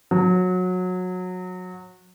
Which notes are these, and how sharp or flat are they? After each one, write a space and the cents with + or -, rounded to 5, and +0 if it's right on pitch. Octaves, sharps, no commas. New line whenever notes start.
F#3 -20